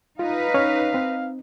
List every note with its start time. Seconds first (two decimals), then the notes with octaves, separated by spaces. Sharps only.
0.19 D#4 F4 B4 F5
0.54 C#4 C#5 F6
0.94 C4